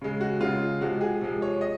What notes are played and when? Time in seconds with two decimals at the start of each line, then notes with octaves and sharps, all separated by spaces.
0.02 C#3 G#3
0.21 F#4
0.41 C#3 G#3 F4
0.81 C3 F3 G#3 F#4
1.01 G#4
1.21 C3 F3 G#3
1.42 C#5
1.61 D#5